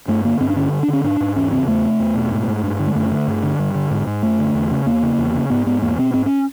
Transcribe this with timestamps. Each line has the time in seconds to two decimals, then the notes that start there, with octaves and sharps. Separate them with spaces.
0.08 G2 A3
0.25 D3 A#3
0.40 G2 C4
0.50 D4
0.56 D3 C#4
0.72 G2
0.83 D4
0.88 D3
0.93 C#4
1.04 G#2 D4
1.20 G#2
1.36 E2 C#4
1.51 C#3 C4
1.67 E2 A3
1.84 C3
2.00 E2
2.15 B2
2.32 G#2
2.48 G#2
2.63 G2
2.79 D3
2.87 G#3
2.95 F#2 A3
3.11 D3
3.27 G2
3.43 D3
3.59 G2
3.75 D3
3.91 G#2
4.07 G#2
4.23 F#2 A3
4.39 D3
4.55 E2
4.71 C#3
4.86 E2 A#3
5.03 C#3
5.18 E2
5.34 C#3
5.50 G#2 B3
5.66 G#2 B3
5.82 E2 A#3
5.98 B2 C4
6.14 G#2 C4
6.26 C#4